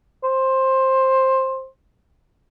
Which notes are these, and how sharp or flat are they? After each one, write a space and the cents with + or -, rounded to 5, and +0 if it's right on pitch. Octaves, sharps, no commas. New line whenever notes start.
C5 +15